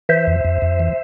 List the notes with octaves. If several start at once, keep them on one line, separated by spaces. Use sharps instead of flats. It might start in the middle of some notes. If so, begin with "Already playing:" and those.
E3 C5 E5
F2
F2
F2
E3